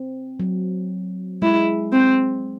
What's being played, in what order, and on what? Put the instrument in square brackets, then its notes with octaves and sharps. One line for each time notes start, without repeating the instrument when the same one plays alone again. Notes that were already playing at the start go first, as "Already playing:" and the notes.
Already playing: [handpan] C4
F#3
[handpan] G#3 [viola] E4
[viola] C4